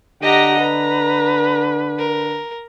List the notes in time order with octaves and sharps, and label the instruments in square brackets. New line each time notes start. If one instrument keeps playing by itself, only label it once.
[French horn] D3 [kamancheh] G4 F#5 [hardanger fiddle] D#5 A#5
[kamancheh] B4 [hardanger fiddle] A#5
[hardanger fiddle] A#4